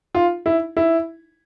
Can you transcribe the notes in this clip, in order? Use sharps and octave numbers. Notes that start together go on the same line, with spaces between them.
F4
E4
E4